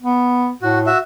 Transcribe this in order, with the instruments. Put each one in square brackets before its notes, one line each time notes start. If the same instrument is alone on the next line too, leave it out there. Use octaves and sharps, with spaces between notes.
[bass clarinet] B3
[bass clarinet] A2 [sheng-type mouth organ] F#4
[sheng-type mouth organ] F#4 E5